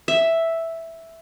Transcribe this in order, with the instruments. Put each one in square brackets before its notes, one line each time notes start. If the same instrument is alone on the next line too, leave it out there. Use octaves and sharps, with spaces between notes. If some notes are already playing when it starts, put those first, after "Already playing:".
[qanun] E5